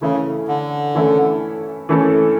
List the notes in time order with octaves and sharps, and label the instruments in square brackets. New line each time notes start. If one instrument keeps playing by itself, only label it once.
[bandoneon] C#3 [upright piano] E3 A3 C#4 E4 A4
[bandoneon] D3
[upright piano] E3 A3 C#4 E4 A4
E3 A3 C#4 E4 A4